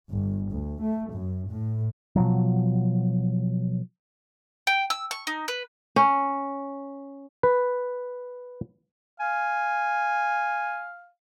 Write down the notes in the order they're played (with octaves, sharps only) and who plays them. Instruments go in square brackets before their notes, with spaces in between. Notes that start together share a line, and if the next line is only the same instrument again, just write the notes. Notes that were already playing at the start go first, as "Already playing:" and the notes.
[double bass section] G1
D2
A3
F#2
A2
[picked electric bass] B2 F3 F#3
[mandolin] G5
E6
C#6
D#4
B4
[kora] C#4
[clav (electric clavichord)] B4
[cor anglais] F5 [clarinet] G#5